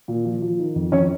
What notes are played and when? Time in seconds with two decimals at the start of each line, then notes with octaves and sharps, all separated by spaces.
0.08 A#2
0.25 F3
0.42 F3
0.59 D#3
0.76 F2
0.92 F2 C#4 C#5